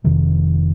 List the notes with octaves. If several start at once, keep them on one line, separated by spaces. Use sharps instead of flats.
F1 F2 C3 D#3